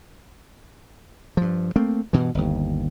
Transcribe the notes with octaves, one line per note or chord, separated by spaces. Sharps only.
G2 F3
A3 A#3 C4
G2 B2 E3
G1 D#2